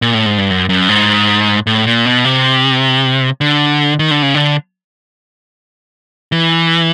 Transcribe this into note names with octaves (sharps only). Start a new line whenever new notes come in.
A#2
A2
G#2
G2
F#2
F#2
G#2
A2
A#2
B2
C3
D3
D#3
D3
C#3
D3
E3